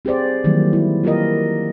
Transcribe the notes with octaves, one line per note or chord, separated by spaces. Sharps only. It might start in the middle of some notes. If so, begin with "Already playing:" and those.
C4 G4 G#4 C5 D5
D#3 E3 F#3 G3 A#3
E4
A#3 F4 G4 A#4 D#5